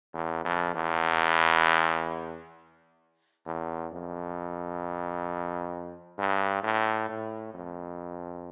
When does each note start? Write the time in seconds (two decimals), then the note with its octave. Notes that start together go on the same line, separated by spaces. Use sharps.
0.14 E2
0.45 F2
0.74 E2
3.46 E2
3.92 F2
6.19 G2
6.63 A2
7.09 A2
7.54 F2